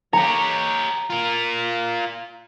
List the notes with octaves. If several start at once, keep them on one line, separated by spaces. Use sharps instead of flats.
G4 C#5 A#5
F4 A#4